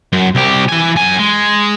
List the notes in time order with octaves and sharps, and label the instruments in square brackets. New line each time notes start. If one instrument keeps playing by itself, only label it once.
[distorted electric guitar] F#2
C2 G4
E3 G#5
F#2 G#5
G#3